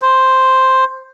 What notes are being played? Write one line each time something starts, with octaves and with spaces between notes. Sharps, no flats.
C5